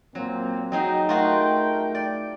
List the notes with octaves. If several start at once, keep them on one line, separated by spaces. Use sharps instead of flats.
A#2 F#3 A#3 C4
F#3 D#4 F#4 G#4 D#5 G5
A3 F4 F#4 G#4 A#4 G5
D5